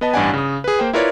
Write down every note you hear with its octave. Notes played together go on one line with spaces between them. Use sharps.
B3 B4 D#5 A5
A1 G2 D4 D5 F#5 G#5
C#3 D#6
G#4 B4
A#3 C5 G5
E4 F4 A#4 B4 C#5 D5